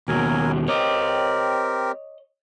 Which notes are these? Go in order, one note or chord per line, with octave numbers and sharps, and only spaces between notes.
D#2 B2 F#3 A#4 G#5
C4 G4 A#4 C#5 D#5